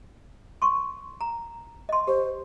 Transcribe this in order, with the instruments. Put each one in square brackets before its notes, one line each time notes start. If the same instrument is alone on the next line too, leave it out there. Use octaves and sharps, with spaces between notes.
[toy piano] C6 C#6
A#5
D#5 C6
[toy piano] G4 [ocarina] C5